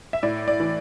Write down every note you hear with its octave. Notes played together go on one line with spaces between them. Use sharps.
E5
A2 D5
D5
E3